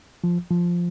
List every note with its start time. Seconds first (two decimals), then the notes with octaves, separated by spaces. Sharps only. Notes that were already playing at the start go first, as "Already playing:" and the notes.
0.24 F3
0.50 F3